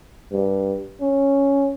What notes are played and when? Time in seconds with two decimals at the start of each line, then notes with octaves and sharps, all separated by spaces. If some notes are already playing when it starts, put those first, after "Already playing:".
0.32 G2
1.01 C#4